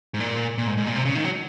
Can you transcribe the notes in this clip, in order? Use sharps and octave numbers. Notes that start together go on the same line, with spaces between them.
G#2
A#2
A#2
G#2
G#2
A#2
C3
C#3
D#3
F#3